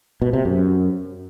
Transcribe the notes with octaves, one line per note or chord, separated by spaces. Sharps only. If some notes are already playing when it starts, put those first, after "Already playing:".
B2
C3
F#2